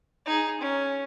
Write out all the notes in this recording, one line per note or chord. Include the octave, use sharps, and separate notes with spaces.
D#4 G#4
C#4